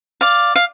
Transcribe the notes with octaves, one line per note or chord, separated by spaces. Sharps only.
D5 F5
F5